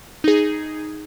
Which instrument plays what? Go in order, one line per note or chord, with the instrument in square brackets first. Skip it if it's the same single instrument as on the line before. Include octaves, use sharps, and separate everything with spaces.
[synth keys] D#4 G#4